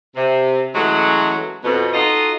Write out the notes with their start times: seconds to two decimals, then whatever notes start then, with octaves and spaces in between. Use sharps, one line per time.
0.16 C3
0.74 E3 F#3 G#3 A3 C#4 F#4
1.64 F2 B2
1.94 D#4 F4 F#4 A4 D#5